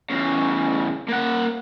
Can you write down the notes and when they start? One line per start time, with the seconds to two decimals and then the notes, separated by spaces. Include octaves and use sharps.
0.10 E2 C#3
1.09 A#3 F#5